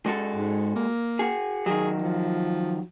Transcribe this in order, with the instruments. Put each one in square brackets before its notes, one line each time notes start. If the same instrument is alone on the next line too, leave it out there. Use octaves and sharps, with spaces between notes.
[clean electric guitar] G#3 F#4 A4
[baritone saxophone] G#2
A#3
[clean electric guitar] F#4 G#4
[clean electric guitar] D#3 F#3 [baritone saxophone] G#4
[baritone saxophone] F3